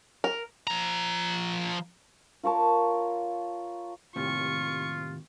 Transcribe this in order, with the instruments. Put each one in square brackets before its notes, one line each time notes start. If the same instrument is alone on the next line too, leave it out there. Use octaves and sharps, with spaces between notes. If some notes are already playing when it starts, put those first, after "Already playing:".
[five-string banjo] A#4
[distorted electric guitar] F3 A#5
[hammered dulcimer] F4 A#4 C#5 A5
[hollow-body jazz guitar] D#2 A2 C3 [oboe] F4 [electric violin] C#6